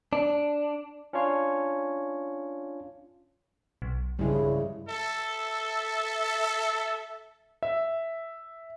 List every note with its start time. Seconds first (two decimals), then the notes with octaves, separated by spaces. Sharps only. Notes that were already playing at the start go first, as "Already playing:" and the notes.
0.13 D4
1.13 C#4 D4 F4 C#5 F5
3.82 B1
4.19 G2 C#3 G3 G#3 E4
4.89 A4 E5
7.63 E5